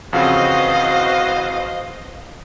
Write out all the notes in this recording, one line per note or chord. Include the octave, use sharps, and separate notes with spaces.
F2 C#3 E3 C4 F#4 C5 D#5 F5